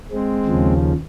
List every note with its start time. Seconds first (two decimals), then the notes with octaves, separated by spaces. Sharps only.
0.11 G#3 C4
0.45 D#2 C#3 F3